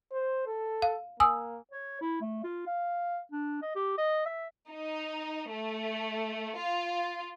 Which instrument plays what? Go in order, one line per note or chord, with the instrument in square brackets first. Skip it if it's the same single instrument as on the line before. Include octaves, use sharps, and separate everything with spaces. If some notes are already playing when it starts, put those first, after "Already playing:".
[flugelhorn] C5
A4
[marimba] F5
[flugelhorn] A#3 [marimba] G#5 D#6 E6
[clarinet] C#5
E4
A3
F4
F5
D4
D#5
G4
D#5
E5
[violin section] D#4
A3
F4